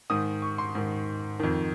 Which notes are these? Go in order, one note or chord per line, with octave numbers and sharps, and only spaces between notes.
G#2 D#3 D#6
C#6
C6
G#2 D#3
F2 D#3